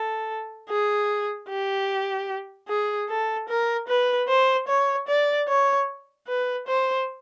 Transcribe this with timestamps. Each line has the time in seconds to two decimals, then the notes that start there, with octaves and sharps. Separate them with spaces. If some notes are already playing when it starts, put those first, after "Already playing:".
Already playing: A4
0.69 G#4
1.49 G4
2.69 G#4
3.09 A4
3.49 A#4
3.88 B4
4.28 C5
4.68 C#5
5.08 D5
5.48 C#5
6.28 B4
6.67 C5